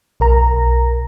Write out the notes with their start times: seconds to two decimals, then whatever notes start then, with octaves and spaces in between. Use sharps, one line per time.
0.20 B1 A#4 A#5